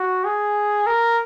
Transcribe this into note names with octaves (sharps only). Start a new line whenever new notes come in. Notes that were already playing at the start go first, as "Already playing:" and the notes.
Already playing: F#4
G#4
A#4